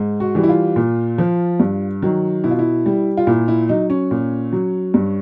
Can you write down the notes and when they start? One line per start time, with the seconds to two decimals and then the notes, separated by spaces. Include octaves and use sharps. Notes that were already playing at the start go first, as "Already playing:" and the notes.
Already playing: G#2
0.20 F#4
0.35 E3 G3
0.43 E4
0.49 F4
0.76 A#2
1.18 F3
1.60 G2
2.03 D#3 F#3
2.44 B2 E4
2.51 F4
2.59 E4
2.86 G3
3.17 F4
3.27 A#2 E4
3.48 E4
3.69 F#3 D#4
3.90 C#4
4.11 A#2
4.53 F#3
4.94 G2